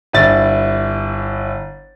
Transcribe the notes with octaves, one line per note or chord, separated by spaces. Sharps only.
G1 E4 A6